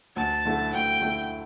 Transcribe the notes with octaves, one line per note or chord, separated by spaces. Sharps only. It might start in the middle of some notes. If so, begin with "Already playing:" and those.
D2 A5
D3 A3 E4
D2 G5
D3 A3 E4